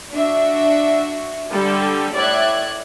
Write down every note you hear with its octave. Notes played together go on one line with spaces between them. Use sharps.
D4 F#4 E5
D3 G3 A4
A2 D5 E5 F#6 G#6